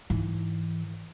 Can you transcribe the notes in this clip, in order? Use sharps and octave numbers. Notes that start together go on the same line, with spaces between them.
G#2 E3